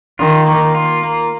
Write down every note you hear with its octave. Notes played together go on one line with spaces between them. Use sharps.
D#3 F4
A#3
F4
A#3